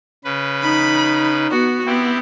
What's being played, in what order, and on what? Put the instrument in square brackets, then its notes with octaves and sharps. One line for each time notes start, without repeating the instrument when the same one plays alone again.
[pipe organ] C#3 B4
[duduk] D#4 [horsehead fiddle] B5
[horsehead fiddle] B3 F#4
[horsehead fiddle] B3 [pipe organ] C4 E4 G4